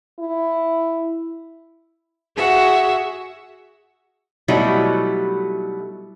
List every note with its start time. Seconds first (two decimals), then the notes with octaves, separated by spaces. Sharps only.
0.19 E4
2.36 F#4 G#4 E5 F#5
4.48 B2 F#3 G3 A3 D#4 E4